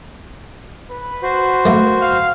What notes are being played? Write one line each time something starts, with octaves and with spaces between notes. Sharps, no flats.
B4
F#4 C5
A3 A#3
F5